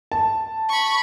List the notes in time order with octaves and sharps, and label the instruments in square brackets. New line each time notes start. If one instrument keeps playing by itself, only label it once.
[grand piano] A5
[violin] B5 C#6